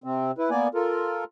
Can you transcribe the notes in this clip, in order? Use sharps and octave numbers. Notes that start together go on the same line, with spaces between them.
C3 C4
E4 B4
A#3 B3 D5 G#5
F4 A4 A#4